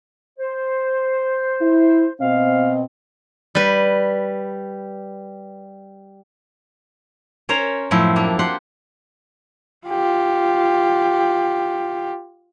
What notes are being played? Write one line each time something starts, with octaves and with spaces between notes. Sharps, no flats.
C5
E4
B2 C4 D#5 F5
G3 B4
C#4 A#4 C5 C#5 A#5
F#2 A2 F3 C4 E4
A#3 D4
F4 G4 F#5 C6
F4 G4